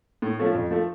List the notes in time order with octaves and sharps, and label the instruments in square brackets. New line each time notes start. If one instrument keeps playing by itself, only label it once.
[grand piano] A2
F3 A3 C#4
F2
F3 A3